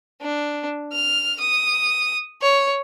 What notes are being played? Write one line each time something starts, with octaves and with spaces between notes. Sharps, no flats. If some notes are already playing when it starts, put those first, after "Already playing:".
D4
F6
D#6
C#5